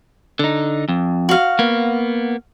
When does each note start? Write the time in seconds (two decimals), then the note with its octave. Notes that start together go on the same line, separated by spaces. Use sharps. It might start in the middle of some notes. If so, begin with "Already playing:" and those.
0.39 D3 D#4
0.89 F2
1.29 F#4 F5
1.59 A#3 B3